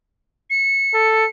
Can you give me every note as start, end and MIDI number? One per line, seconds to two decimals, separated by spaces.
0.50 1.29 97
0.94 1.25 69